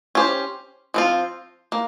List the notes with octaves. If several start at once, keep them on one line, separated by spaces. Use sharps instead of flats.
C#4 G4 C5
F3 C4 F4
A#3